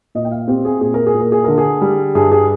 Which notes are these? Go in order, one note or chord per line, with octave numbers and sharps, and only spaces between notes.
A#2 D#5
G5
F5
C4 G4
G#4
A#2 G#4
A#4
G#4
A#2
A#4
G#4
D3 A#4
G#4
G3
G2 G#4
G#4